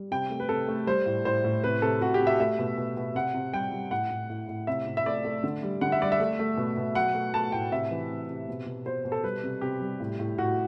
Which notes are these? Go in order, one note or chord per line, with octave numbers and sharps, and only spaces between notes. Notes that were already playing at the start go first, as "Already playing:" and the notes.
Already playing: G3
C3 G5
A3
B4
C3 A4
A3
G3 C5
A2
A2 C5
A2
C3 B4
C3 A4
C3 F#4
G4
C3
E5
A3 E5
B2
B2
B2
C3 F#5
C3
G3 G5
G3
A2 F#5
A2
A2
A2
C3 E5
C3
E5
A3 D5
A3
D3
G3
D3 F#5
E5
G3 D5
E5
A3
A3
B2
B2
F#3 F#5
A3
A3 A5
A2 G5
C3 E5
E3
C3
C3
B2
B2
B2 C5
B2
A4
G3 B4
C3
C3 G4
G3
A2
A2
A2 F#4